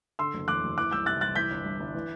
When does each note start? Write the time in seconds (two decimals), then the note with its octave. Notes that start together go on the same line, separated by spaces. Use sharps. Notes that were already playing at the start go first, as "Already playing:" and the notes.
0.19 D3 C6 E6
0.33 F#1
0.48 E2 D6 F#6
0.63 F#1
0.78 E3 D6 F#6
0.92 C2 E6 G6
1.06 C3 F#6 A6
1.21 C2 F#6 A6
1.36 E3 G6 B6
1.50 G1
1.64 G2
1.80 G1
1.95 E3